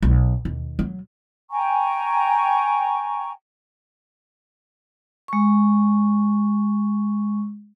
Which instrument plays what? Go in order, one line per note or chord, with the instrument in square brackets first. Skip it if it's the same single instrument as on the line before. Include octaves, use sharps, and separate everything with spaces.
[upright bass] B1
D#2
F#3
[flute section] G5 G#5 A#5 C#6
[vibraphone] G#3 C#6